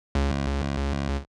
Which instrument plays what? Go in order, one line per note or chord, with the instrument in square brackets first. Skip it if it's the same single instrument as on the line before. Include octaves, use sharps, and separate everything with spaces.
[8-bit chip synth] C#2